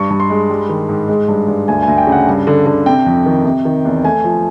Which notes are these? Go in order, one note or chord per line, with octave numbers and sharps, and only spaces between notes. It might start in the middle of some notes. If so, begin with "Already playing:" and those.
Already playing: G2 C#6
G2
C6
G#3
G3
D#3
G#2
G#3
G2
G2
D2 G#5
D2 G#5
G5
C#3
F#5
G2
D3
D3
C3 G5
F2
D#3
C3
D#3
E2
A3 G#5
F3